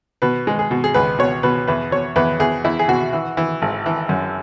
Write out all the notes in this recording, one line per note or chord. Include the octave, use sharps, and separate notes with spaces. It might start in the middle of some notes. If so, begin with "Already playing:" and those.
B2 B4
G#3
G#4
B2
G#4
C#2 B4
B2 C#5
B2 B4
E2 B4
B2 C#5
E2 B4
E2 G#4
E2 E4
G#4
B2 F#4
E3
E3
G#1
E3
F#2